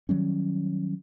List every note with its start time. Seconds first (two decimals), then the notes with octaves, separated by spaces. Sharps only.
0.09 D#3 F#3 G3 C#4